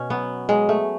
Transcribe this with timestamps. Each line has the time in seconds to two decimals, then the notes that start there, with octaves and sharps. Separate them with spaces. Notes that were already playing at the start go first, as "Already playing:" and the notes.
Already playing: B2 C#4
0.10 F#3 B3
0.49 F#3 G#3
0.69 A3